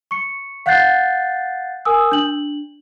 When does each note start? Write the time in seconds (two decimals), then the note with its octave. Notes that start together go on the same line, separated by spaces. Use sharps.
0.11 C#6 C#7
0.66 F5 F#5 F#6 G6 A6 C7
1.85 A#4 G#5 D#6 E6
2.12 D4 F#7